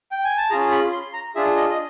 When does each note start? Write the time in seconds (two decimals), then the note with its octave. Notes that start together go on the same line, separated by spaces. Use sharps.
0.11 G5
0.24 G#5
0.38 A5
0.50 C#4 F4 G#4 A#5
0.71 B5
0.92 C6
1.13 A#5
1.35 D4 F4 G#4 E5
1.57 D#5
1.70 D#5